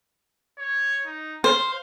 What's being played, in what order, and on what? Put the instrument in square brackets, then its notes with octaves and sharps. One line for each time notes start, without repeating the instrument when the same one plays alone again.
[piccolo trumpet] C#5
D#4
[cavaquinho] C5 [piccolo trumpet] F5